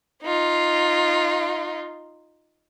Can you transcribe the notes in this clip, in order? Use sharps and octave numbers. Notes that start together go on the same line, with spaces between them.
D#4 F4